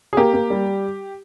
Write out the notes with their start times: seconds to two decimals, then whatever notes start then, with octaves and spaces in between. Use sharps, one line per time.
0.13 G#4
0.17 A#3 G4
0.33 A#3
0.50 G3